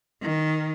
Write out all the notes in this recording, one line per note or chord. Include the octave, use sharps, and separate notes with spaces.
D#3